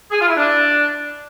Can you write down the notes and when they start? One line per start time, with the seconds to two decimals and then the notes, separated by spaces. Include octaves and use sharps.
0.11 G#4
0.20 F4
0.28 E4
0.37 D4